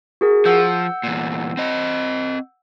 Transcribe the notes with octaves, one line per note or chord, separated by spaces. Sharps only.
F#4 G#4 A#4
F3 F#5 E6 G6
E2 A#2
C4 D#5